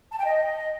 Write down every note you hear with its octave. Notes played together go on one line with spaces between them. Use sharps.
A5
G5
D#5